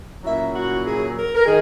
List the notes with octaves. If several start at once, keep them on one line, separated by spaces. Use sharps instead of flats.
A#2 F#3 C#4 E4 E5
F#4
G#4
A#4
A#4
D#3 G#4